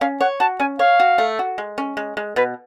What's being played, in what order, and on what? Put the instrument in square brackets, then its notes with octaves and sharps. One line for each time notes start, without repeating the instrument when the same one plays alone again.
[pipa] C#4 [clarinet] F5
[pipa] C#5 [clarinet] F#5
[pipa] F#4 [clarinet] A5
[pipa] C#4 [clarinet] G#5
[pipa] C#5 [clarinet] F5
[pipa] F#4
A3
F#4
G#3
C#4
G#3
G#3
[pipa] B2 [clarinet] B4